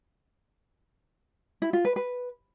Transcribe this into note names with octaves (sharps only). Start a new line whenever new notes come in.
E4
F4
B4
B4